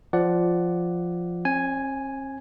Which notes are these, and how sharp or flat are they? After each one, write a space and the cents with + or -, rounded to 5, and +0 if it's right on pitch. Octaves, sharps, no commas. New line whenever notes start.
F3 +0 D5 +0 F#5 +10
C4 +45 G#5 +0